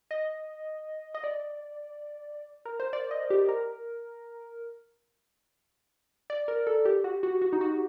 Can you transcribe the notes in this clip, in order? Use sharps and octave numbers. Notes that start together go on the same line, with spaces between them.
D#5
D#5
D5
A#4
C5
D5
D#5
G4
A#4
D5
A#4
A4
G4
F#4
F#4
F#4
D#4
F#4